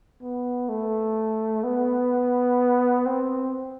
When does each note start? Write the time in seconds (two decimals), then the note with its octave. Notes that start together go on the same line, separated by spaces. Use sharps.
0.22 B3
0.69 A3
1.64 B3
3.06 C4